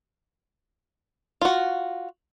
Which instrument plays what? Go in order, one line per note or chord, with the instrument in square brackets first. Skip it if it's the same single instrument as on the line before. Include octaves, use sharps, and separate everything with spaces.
[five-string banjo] F4 F#4